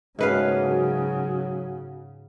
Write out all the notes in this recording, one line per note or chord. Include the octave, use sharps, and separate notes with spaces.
G#2 C#3 A3 A#3 C#4 F#4 B4 F5
F#3